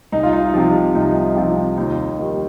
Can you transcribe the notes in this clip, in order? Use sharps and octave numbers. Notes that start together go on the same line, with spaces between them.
C2 D#4
F4
D#4
C3 F3
C2 D#4
D#4
C3 F3 F4
D#2 D#4
D#3 G3